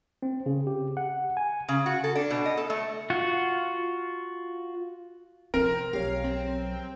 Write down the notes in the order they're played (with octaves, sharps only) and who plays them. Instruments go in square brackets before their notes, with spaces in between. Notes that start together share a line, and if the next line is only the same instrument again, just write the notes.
[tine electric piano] C4
C#3
G4
F#5
G#5
[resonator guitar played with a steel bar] C#3
F#4
A4
D4
B2
D#5
A4
A3
[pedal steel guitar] F4 F#4 F#5
[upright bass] C3 F3 [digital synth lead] C4 [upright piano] A#4
[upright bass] B1 F#3 [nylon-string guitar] G4 G#4 C#5 [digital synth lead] F5
[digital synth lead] C4